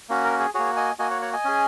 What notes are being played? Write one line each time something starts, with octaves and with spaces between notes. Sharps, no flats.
A#3 C#4 F#4
A#4
G#4
A#3 F#4 G#4 C#5
D#5 G#5
A#3 F#4 D#5 G#5
C#5 F#5
C#5 F#5
D#5 G#5
C#4 G#4